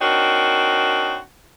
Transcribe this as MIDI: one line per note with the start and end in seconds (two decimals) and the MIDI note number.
0.01 1.17 60
0.01 1.17 62
0.01 1.17 63
0.01 1.17 66
0.01 1.17 70
0.01 1.17 73